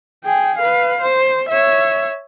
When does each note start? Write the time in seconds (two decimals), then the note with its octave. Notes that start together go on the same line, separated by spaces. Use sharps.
0.24 G#4 G5
0.57 B4 F5
1.01 C5
1.49 C#5 E5